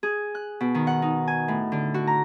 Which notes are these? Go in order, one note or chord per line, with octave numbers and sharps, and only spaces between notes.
G#4
F#6
B2
D#3
F#5
D#4
G#5
A2
D3
F#4
A#5